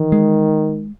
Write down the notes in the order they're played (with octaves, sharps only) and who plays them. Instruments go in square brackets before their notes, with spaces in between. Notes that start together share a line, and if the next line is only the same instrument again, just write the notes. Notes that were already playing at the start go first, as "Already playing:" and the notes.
Already playing: [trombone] D#3 [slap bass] E3
[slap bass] G#3